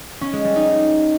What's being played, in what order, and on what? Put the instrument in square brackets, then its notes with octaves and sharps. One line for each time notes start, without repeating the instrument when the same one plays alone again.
[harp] C#4
G#3
G3
D#4